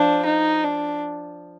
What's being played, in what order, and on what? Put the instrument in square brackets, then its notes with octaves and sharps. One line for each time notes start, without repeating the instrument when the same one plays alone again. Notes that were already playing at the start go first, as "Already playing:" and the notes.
Already playing: [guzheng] F3 [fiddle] D4
[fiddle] D#4
D4